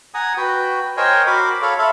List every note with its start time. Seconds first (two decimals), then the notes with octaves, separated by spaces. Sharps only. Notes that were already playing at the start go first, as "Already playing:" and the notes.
0.14 F#5 G#5 A#5 D#6
0.37 F#4 B4 G5
0.97 A#4 C5 C#5 D#5 G5 G#5
1.27 F#4 A#4 B5 C6 D6
1.62 A4 C#5 F5 B5
1.79 A4 E5 F5 B5 C6